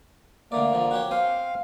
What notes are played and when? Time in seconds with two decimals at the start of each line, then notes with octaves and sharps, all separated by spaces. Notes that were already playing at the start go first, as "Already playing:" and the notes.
0.52 D3 A3 A#3 D5
0.73 D3 F3
0.91 F#4 G4 C#5
1.11 C4 C5 F5 G#5